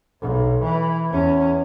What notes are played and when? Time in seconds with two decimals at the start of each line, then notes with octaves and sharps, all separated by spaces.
0.22 B1
0.63 E3
1.10 E2 C#4